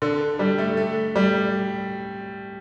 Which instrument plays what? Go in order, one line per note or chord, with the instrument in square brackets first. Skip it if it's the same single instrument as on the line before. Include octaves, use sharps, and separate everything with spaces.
[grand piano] D3
G3
A3
A3
G3